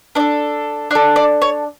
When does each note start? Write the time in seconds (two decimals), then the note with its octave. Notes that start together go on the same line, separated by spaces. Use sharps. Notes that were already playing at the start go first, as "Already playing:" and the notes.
0.15 D4 D5
0.20 A4
0.91 D4 D5
0.95 A4
1.16 D5
1.42 C#5